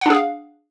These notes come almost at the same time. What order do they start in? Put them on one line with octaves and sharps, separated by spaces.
F#5 D4 G#4 F5